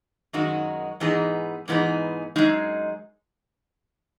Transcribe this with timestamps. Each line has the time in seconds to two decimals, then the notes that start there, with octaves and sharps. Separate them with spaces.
0.33 F#2 D#3 G#3 D#4 F#4
1.00 G#2 E3 B3 D#4 G#4
1.68 G#2 E3 B3 D#4 G#4
2.36 F#2 C#3 G#3 D#4 G#4